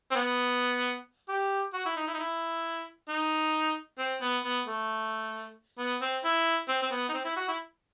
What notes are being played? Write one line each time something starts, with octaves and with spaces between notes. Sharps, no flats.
C4
B3
G4
F#4
E4
D#4
E4
D#4
E4
D#4
C4
B3
B3
A3
B3
C4
E4
C4
C4
B3
D#4
C4
E4
F#4
E4